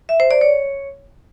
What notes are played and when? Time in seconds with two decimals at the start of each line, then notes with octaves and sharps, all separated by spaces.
0.09 E5
0.20 C5
0.31 D5
0.41 C#5